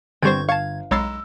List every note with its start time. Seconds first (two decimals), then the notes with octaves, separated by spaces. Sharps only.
0.22 G1 D3 G3 C4 C5 C#6 G6 G#6
0.49 F5 A5 C#6 G#6
0.91 B1 G#3 C#5 A#5 B5 E6 A6 C7